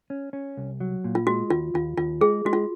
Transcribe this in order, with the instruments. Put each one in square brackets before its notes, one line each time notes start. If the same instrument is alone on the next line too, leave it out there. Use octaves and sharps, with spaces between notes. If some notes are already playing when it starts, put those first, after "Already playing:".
[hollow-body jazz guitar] C#4
C#4
C2
F#3
A#2
[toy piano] F4
[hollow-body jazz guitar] G#3 [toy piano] F#4
[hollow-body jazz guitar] D#2 [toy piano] F4
[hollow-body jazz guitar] D#2 [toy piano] F4
[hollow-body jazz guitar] D#2 [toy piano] F4
[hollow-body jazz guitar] G#3 [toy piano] G#4
[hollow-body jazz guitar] G#3 [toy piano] F#4
[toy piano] F4